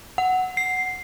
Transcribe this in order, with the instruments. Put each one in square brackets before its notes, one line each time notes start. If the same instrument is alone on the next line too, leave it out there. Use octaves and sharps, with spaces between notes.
[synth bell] F#5
C7